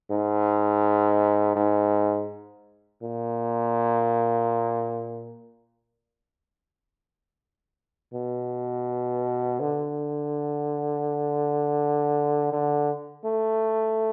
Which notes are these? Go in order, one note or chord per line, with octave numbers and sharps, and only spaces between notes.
G#2
G#2
A#2
B2
D3
D3
A3